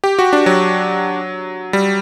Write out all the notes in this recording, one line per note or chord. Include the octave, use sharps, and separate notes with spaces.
G4
F#4
D4
F#3
G3